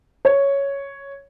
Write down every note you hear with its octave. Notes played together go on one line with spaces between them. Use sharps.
C#5